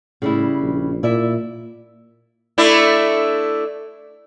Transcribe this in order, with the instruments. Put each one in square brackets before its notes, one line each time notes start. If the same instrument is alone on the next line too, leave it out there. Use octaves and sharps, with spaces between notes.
[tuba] A2 [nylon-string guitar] C#3 G3 E4
[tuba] A#1
[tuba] A#2 [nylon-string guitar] E4 D5 E5
[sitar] A3 D4 E4